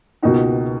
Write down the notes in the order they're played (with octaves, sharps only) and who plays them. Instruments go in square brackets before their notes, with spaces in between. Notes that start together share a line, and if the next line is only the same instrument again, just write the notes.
[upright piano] C#2 B2 A#3 D#4 F#4